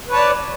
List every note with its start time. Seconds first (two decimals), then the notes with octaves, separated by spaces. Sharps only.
0.08 B4
0.11 C#5
0.13 A5
0.16 D5